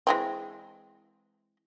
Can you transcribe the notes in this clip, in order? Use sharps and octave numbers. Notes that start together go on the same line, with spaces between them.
E3 G#3 C4